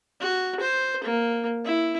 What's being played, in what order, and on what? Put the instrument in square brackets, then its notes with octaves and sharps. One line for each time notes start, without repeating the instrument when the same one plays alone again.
[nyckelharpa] F#4
C5
A#3
E4